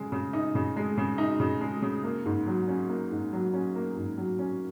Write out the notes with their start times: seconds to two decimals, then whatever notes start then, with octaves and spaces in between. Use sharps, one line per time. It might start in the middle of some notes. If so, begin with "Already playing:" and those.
Already playing: C#3 G#3
0.12 C#3
0.33 D#4
0.55 C#3
0.76 G#3
0.97 C#3
1.18 D#4
1.40 C#3
1.61 G#3
1.82 C#3
2.04 A#3
2.26 G#2
2.47 F#3
2.68 C#4
2.89 A#3
3.11 G#2
3.33 F#3
3.54 C#4
3.75 A#3
3.97 G#2
4.18 F#3
4.39 C#4